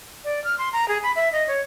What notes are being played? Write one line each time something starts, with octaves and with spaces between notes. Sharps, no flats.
D5
F6
C6
A#5
G#4
B5
E5
D#5
C#5